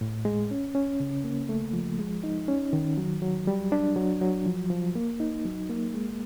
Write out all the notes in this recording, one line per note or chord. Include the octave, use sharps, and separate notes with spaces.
A2
G#3
C#4
C#4
C#3
A#3
A3
F3
G#3
D#4
C#4
D#3
F#3
F#3
G3
D4
F#3
F#3
F3
F3
A#3
D#4
F#3
A#3
G#3